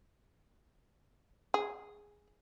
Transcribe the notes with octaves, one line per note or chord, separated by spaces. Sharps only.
G#4